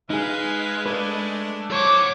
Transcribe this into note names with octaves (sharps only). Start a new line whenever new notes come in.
G#3 D#4 G#4 B4 F5
A3 D4 B4
F#3 C5 C#5 D6